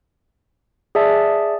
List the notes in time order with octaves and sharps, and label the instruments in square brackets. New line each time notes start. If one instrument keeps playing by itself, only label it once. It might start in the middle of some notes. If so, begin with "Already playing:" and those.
[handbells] G#4 D5 E5 A5